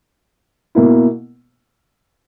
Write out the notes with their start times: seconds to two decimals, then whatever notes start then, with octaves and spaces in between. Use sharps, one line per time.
0.75 B2 A#3 E4